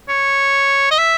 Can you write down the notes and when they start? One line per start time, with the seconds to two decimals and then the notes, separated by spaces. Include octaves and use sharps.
0.09 C#5
0.91 D#5
0.98 E5